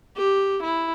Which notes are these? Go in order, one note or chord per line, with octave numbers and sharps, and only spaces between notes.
G4
E4